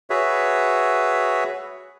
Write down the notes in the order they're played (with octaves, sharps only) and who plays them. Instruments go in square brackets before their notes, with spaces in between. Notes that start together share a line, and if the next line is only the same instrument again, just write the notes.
[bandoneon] F#4 G#4 B4 C#5 E5